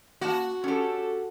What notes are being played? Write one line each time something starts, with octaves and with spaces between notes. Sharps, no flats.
A#3 F#4 A5
C#4 G4 A4